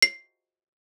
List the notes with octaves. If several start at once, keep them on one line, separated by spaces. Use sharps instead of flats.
C7